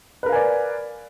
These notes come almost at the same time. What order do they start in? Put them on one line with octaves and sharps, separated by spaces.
B4 A#4 F5 G#5 D5